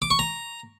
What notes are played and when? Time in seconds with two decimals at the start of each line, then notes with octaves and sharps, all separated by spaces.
0.02 D6
0.10 C#6
0.19 A#5